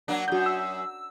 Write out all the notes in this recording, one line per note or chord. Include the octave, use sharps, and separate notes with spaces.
F#3 A#3 D4
F#2 A2 F#4 G6
E6